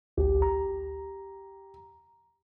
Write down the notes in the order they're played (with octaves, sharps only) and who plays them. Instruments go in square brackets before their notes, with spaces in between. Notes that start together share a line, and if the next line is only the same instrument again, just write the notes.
[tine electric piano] A1 D2 [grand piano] G4
[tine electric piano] A#5